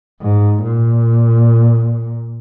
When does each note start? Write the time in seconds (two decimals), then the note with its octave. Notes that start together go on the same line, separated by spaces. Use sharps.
0.21 G#2
0.63 A#2